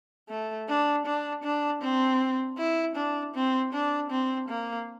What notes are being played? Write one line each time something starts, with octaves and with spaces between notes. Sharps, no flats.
A3
D4
D4
D4
C4
E4
D4
C4
D4
C4
A#3